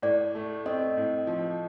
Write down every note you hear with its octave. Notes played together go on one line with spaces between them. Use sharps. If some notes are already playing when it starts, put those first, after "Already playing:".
A2 D5
A3
C4 D#5
A2
F3